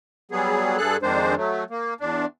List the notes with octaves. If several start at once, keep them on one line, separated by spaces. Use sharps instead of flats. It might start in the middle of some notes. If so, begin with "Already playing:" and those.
F#3 G3 B3 G#4
G2 G#4 A4 F#6
F2 D#3 G#3 D4 C5
F#3 A3
A#3
E2 D4